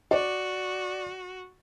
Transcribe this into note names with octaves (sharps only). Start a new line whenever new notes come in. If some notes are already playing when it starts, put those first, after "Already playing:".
F#4 D5